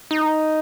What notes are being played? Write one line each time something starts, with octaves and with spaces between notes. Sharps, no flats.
D#4